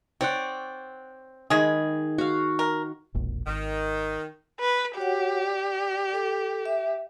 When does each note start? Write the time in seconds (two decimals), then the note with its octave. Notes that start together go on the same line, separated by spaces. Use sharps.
0.21 C4 C#5 D5 F#5
1.50 D#3 G#3 G#4 B5
2.18 F#4 F5
2.59 A#4
3.14 E1 A#1
3.47 G#1 D#3
4.60 B4
4.98 F#4 G4 C#5 F#5
5.43 D5
6.13 A4 D6
6.66 E5